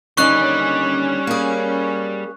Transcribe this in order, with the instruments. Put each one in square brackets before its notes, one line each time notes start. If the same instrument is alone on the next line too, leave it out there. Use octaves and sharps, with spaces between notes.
[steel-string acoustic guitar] D#2 D3 D#5 [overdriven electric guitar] G3 [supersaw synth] C#4 [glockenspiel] C#6 F#6
[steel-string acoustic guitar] A#3 G#4